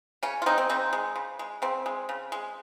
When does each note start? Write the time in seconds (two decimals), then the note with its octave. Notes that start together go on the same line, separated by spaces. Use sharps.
0.23 C#3 C#4
0.42 F4
0.46 G#3 C4 D#4
0.58 C4
0.69 C#3 C4 D#4
0.93 G#3
1.16 C#3
1.39 G#3
1.62 C#3 C4
1.86 G#3
2.09 C#3
2.32 G#3